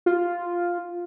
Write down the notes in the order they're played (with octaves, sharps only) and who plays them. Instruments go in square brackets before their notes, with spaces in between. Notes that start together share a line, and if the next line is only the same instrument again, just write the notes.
[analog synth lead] F4